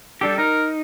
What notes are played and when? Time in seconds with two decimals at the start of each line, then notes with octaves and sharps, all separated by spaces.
0.21 G3 D4 G4 A4
0.38 D#4 A#4